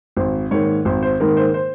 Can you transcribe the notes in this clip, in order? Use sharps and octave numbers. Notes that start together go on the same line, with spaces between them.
G#1 C5
G#2 D#3 A#3 C#5
G#1 C5
C5
G#2 D#3 A#3 A#4
C5
C5